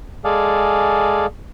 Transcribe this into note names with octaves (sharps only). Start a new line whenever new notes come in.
G#3 G#4 A4 D5 F5